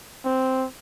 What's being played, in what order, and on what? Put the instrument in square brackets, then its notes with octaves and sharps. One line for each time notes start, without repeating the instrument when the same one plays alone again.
[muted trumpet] C4